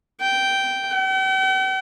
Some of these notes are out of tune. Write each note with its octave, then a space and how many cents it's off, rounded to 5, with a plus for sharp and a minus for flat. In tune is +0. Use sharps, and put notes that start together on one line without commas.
G5 -10
G5 -45